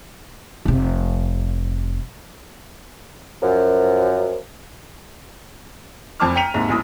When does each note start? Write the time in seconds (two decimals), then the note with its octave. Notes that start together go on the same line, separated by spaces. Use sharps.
0.65 F1 C3
3.41 F#2 F3
6.20 F1 F2 A5 D6 F6
6.36 G5 A#5 B6 C#7 D#7 F7
6.54 D#2 G#2 C3
6.69 B1 F#2 A2 D#6 E6